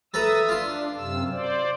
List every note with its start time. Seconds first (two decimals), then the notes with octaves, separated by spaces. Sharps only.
0.14 A4 B4 E5 A#5 D#6 E6
0.49 D4 F4 C6
0.97 F#2 C3 E6
1.31 C5 D5